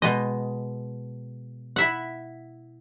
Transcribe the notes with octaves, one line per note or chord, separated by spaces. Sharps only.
B2 G#3 D#5
E4 E5 F#5